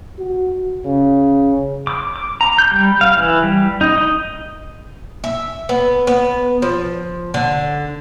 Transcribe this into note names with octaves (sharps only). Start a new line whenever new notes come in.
F#4
C#3
D6
D6
A#5
G6
G3
F5
E3
G3
D#4
D#5
E5
B3
B3
F3
D3